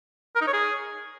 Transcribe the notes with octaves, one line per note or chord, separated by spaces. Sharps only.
A#4
D#4
C#5
G#4